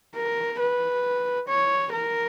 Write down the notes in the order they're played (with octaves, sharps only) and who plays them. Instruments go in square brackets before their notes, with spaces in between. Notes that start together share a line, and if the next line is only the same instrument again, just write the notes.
[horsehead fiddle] A#4
B4
C#5
A#4